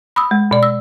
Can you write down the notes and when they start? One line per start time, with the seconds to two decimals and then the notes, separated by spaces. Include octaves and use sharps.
0.16 B5 D#6 E6
0.31 G#3
0.51 B2 D5
0.63 E6